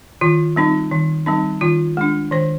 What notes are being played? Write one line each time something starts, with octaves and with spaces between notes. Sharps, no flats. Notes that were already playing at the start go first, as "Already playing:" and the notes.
D#3 F4
G3 C4 D#4
D#3
G3 C4 D#4
D#3 F4
G#3 D4
D#3 C5